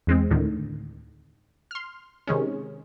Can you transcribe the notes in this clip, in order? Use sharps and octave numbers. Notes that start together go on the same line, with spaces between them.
E2 G#3 C4
D2 A2 D3 D#3
C6 F6
C3 D#3 G#3 C#4